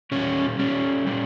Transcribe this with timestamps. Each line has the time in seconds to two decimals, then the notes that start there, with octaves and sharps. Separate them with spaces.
0.12 A#2 G3 C#4
0.59 A#2 G3 C#4
1.07 A#2 G3